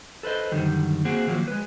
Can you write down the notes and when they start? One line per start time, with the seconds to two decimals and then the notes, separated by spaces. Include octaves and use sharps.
0.23 A4 B4 C5 D#5
0.51 F#2 D3 D#3 G3
1.05 A#3 C4 F#4 G#4
1.27 D#3 F3 F#3 A#3
1.47 G#3 B4